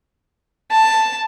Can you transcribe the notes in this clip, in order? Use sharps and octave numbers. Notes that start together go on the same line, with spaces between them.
A5